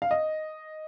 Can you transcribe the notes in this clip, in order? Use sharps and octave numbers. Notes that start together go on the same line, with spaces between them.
F5
D#5